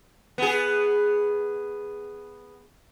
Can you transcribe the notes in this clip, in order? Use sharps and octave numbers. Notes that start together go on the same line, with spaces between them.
B3 G#4